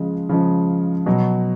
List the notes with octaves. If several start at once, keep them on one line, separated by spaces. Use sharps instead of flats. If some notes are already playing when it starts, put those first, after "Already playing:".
Already playing: C#3 F3 G#3
C#3 F3 G#3
B2 F#3